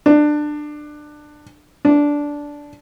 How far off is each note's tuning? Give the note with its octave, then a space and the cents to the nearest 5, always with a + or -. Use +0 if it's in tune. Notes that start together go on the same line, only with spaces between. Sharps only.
D4 +20
D4 -10